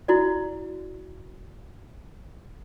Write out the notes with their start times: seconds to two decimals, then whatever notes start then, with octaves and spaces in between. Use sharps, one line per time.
0.08 E4 F#4 D5